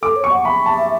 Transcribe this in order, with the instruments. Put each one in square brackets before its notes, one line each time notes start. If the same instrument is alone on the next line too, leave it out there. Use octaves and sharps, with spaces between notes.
[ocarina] A4 [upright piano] D6
[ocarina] C#5
[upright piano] C#6
[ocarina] F#5
[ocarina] E5 [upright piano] B5
[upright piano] A5